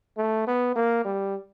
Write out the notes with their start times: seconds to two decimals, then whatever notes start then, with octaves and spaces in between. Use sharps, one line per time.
0.18 A3
0.47 B3
0.76 A#3
1.05 G3